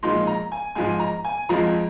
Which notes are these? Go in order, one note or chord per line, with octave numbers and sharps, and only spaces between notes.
A#2 F3 G#3 D#4 C6
A#5
G#5
G#2 F3 G#3 G#5
A#5
G#5
F2 F3 G#3 A#5